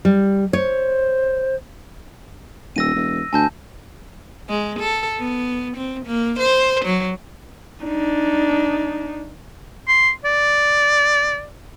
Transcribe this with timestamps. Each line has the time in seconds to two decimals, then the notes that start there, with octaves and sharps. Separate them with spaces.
0.05 G3
0.53 C5 C#5
2.76 D#1 E6 A#6 D#7
2.95 E1
3.33 D2 G#5 A5 G6
4.49 G#3
4.80 A4
5.20 B3
5.77 C4
6.06 A#3
6.39 C5
6.85 F#3
7.83 D4 D#4
9.88 C6
10.25 D5